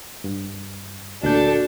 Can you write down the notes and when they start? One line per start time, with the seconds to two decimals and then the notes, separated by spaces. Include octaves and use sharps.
0.24 G2
1.23 D2 A#2 D4 F#4 A4 G6